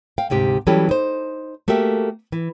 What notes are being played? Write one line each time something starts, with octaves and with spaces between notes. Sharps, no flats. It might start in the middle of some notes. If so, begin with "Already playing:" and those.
F5 G5
D2 G#2 C3 G4
E3 F#3 G3 C#4 G4 A4
D#4 C5
A3 A#3 F#4 G4 E5
E3